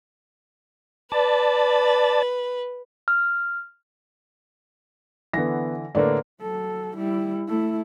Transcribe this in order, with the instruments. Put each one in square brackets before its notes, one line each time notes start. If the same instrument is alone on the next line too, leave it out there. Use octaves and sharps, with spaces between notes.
[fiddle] B4 [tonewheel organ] D5 A5
[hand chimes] F6
[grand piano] D3 E3 [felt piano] B3 A#6
[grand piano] A2 D3 A#3 [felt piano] B4 D5
[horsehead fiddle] F#3 A4
G3 E4
A3 E4